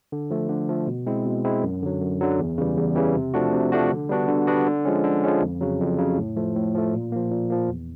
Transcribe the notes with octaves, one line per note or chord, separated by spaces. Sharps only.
D3
F3 A3
D3
F3 A3
B2
G#3 C4 E4
B2
G#3 C4 E4
F#2
D3 F#3
F#2
D3 F#3
E2
C#3 E3 G3
E2
C#3 E3 G3
C3
F3 A3 D4 F#4
C3
F3 A3 D4 F#4
D3
G3 B3 D4 F#4
D3
G3 B3 D4 F#4
D3
F3 G#3 C#4
D3
F3 G#3 C#4
F2
C#3 F#3
F2
C#3 F#3
A2
F3 A3
A2
F3 A3
A#2
F3 A#3
A#2
F3 A#3
E2